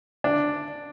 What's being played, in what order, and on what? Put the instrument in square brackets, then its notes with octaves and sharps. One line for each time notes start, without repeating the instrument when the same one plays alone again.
[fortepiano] D4